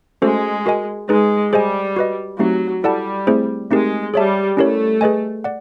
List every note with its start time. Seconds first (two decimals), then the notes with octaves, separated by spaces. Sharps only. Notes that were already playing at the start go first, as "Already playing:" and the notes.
0.22 G#3 A3 C#4 F#4 A4 C5
0.66 F#4 A#4 D#5 G#5
1.09 G#3 D#4 G#4 B4
1.53 G3 G#4 C5 D#5 G#5
1.96 F#4 B4 D#5
2.39 F#3 A3 C4 D#4 G4
2.84 G3 E4 A4 D5 F#5 A5
3.27 A3 C4 E4 G#4 C5
3.70 G#3 A3 C4 D#4 G4 A#4
4.14 G3 G#4 C#5 E5 A5
4.57 A3 C#4 E4 G4 A#4 C#5
5.01 G#4 B4 D#5 G#5
5.44 D5 F#5